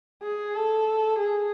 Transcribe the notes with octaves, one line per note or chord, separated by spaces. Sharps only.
G#4
A4
G#4